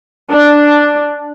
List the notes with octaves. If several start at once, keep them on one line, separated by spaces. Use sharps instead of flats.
D4